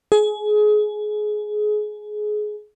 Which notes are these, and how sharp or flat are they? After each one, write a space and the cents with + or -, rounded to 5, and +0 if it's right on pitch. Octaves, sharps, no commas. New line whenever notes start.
G#4 +25